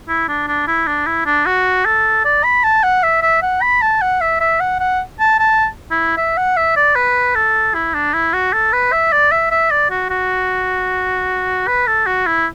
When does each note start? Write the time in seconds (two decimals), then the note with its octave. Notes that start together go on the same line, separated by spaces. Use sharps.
0.08 E4
0.28 D4
0.48 D4
0.67 E4
0.87 D4
1.06 E4
1.26 D4
1.46 F#4
1.85 A4
2.24 D5
2.44 B5
2.63 A5
2.83 F#5
3.03 E5
3.22 E5
3.42 F#5
3.62 B5
3.82 A5
4.01 F#5
4.21 E5
4.40 E5
4.60 F#5
4.80 F#5
5.19 A5
5.39 A5
5.91 E4
6.17 E5
6.37 F#5
6.57 E5
6.76 D5
6.95 B4
7.35 A4
7.74 E4
7.94 D4
8.14 E4
8.33 F#4
8.53 A4
8.73 B4
8.92 E5
9.12 D5
9.31 E5
9.51 E5
9.71 D5
9.90 F#4
10.10 F#4
11.67 B4
11.87 A4
12.06 F#4
12.26 E4